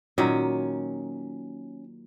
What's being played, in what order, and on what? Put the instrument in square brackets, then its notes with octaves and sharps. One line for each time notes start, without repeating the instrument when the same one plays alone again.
[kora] A#2 D#3 F#3 [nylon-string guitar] C#4